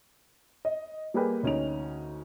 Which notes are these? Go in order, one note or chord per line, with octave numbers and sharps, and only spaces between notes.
D#5
G3 A#3 G#4 A#4 B4 G5
D2 C#4 D#4 F7